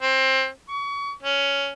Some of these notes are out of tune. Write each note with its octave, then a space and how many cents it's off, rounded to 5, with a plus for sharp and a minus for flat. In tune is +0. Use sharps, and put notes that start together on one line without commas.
C4 +20
C#6 +30
C#4 +10